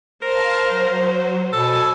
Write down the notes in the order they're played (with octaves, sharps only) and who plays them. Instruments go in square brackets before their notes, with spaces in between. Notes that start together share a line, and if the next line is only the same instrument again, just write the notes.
[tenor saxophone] A#4 [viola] C5 [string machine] F5 A5 F6
[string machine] F#3
[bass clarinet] B2 [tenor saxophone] A4 [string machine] G#5